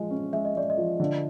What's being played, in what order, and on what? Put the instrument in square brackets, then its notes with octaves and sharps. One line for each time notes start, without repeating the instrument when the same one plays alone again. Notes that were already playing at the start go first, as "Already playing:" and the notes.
Already playing: [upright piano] F3 G#3 [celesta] D#5
[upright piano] C#4
[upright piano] G#3 [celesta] E5
[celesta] D#5
[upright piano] G#3 [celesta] D5
[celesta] D#5
[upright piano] F3
D3